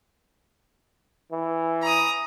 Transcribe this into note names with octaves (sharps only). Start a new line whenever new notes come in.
E3
A#5 D#6